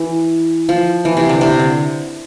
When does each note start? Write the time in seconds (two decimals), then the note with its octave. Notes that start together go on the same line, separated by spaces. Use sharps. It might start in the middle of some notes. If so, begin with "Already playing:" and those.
Already playing: E3
0.69 F3
1.05 E3
1.17 C3
1.29 D3
1.41 C3
1.60 D3